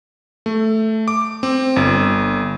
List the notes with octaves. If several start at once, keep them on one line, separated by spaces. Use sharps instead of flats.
A3
D6
C4
G1